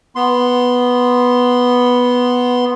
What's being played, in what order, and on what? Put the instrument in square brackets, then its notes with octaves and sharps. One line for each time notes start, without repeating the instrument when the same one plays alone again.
[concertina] B3 C6